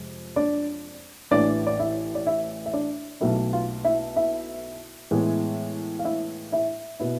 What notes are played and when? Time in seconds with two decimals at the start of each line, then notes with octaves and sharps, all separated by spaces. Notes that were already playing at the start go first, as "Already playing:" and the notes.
Already playing: F2 C3 G#3
0.36 D4 D5
1.31 A1 A2 E3 D4 D5
1.67 D5
1.79 E4 E5
2.15 D5
2.27 E4 E5
2.66 E5
2.73 D4 D5
3.21 B1 B2 A3 E4 E5
3.53 F4 F5
3.84 E4 E5
4.16 E4 E5
5.11 A2 E3 G#3 B3
5.99 F5
6.05 E4 E5
6.52 E4 E5
7.00 B2 B3 E4